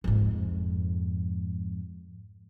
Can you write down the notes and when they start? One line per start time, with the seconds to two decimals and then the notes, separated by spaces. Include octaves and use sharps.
0.04 F2 G#2